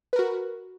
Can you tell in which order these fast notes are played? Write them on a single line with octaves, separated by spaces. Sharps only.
B4 A#4 F#4